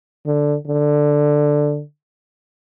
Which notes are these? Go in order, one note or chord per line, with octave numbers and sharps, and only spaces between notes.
D3
D3